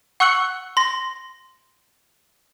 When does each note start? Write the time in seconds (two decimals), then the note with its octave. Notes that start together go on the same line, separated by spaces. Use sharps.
0.20 F#5 C#6 E6 F#6 C#7 F#7
0.77 C6 A#6